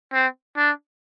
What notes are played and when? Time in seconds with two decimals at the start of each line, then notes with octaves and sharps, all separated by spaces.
0.13 C4
0.57 D4